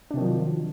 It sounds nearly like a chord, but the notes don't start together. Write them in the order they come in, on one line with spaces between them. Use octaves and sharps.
D4 C3 D#3 F#3 F3